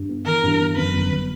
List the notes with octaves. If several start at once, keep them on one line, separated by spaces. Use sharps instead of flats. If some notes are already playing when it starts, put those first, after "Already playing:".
Already playing: G2
B3
E3 A#4
G2
B3
F#2 B4
G1
G1